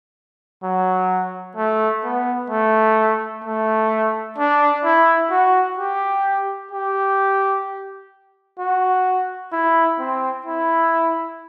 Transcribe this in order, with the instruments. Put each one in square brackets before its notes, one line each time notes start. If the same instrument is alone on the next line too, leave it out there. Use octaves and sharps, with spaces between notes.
[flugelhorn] F#3
A3
B3
A3
A3
D4
E4
F#4
G4
G4
F#4
E4
C4
E4